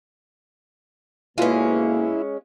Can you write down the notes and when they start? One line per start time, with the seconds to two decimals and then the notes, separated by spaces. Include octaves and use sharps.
1.38 D2 B2 G#3 A#3 C#4 E4 F4 B4